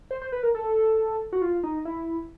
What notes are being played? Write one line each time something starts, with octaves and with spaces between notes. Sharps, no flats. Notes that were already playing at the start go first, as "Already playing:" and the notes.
C5
C5
B4
A#4
A4
F#4
F4
D#4
E4